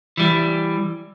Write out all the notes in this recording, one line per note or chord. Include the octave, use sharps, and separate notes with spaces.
E3 G3